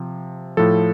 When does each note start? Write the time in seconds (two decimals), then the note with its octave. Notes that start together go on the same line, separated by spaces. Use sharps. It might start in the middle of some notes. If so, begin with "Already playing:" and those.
Already playing: C3 F3
0.57 A2 F3 A4